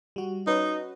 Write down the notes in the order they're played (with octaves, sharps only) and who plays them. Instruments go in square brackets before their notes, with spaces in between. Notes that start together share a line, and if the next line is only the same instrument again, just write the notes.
[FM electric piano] G3 F#4
[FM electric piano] C#4 F#4 B4 [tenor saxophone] D#4